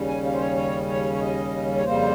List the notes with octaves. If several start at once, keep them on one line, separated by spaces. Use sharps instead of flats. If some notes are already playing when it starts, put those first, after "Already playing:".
Already playing: D#2 C#3 G3 C#4
G#5
F5
C5
C#5
C#5
C#5
C#5
D#5
C#5
F2 C#3 G3 A#3 C5